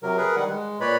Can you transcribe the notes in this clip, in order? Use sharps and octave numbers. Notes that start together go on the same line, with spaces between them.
C3 F#3 A#4
G#4 A#4 B4
D#3 G3 F#5
G#3
A#2 B4 C#5 D5 B5